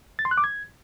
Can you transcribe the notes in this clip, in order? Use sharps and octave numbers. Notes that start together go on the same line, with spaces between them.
A6
C6
F#6
D6
G#6